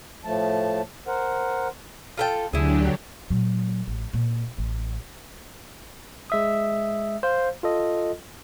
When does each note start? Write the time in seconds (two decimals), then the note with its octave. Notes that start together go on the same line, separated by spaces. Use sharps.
0.25 A2 F3 A3 A5
1.07 A#4 C5 F#5
2.17 F4 A4 G5
2.53 D2 D3 F#3 D4 E4 G4 G#4
3.30 A#2 F#3
3.87 A1
4.14 A#2
4.58 A1
6.30 G#3 E5 D#6
7.23 C5 F5
7.63 F4 A4 D#5